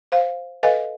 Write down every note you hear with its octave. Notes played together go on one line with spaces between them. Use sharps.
C5 F5
A4 B4 D#5 F5 G#5